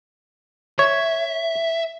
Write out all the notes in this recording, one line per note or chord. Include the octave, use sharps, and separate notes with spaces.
C#5 E5